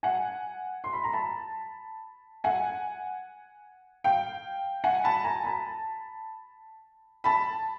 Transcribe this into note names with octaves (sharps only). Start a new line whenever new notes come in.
F#5 G#5
C6
B5
A#5
A5 B5
F#5 G#5
F5 G5
F#5 G#5
A5 B5
G#5 A#5
A5 B5
A5 B5